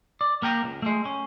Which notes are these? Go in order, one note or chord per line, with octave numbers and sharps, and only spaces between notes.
D5
A#3 A#4 G5 A#5
C#2
G#3 A3
C#4